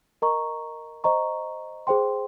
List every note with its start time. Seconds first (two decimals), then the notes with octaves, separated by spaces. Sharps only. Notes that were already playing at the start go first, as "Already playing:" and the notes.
0.22 A#4 D#5 A#5 C#6
1.04 C5 D#5 A#5 C#6
1.87 G#4 C5 G5 C6